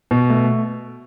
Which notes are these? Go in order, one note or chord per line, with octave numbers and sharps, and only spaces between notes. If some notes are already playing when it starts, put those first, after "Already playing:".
B2
A3